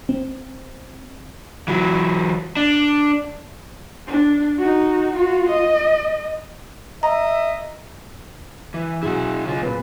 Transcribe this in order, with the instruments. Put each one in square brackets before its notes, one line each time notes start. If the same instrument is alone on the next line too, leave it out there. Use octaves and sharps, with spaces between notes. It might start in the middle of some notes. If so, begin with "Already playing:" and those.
[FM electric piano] C4
[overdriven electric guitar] E3 F#3
D4
[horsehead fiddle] D4
D#4 F#4
F4 F#4
D#5
[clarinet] D#5 [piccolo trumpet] E5 [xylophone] A#5
[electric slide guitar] E3
[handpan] B2 F#3 G#4 [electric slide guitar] E4 F#4
[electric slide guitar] C#3 F4
[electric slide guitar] A#2 [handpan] C4 B4